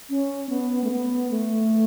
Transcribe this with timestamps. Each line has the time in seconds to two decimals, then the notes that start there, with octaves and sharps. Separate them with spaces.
0.09 C#4
0.49 B3
0.84 A3
0.91 B3
1.30 A3